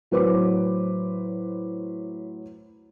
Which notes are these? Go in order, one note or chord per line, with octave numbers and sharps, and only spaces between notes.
A2 F#3 B4 C5 D6